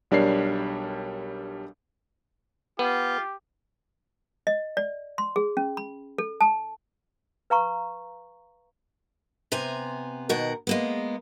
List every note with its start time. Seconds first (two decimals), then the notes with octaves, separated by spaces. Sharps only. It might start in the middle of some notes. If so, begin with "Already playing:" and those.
0.11 B1 G3 D4 A#4 C#5 C7
2.79 B3 F4 G4
4.47 D#5
4.77 D5
5.18 C6
5.36 G#4
5.57 C#4
5.77 B5
6.18 A4
6.41 A5
7.50 B4 F5 A#5 C#6
9.52 C3 B3 C5 G#5 A#5
10.29 B2 D#3 A#4 F#5
10.67 G#3 A#3 B3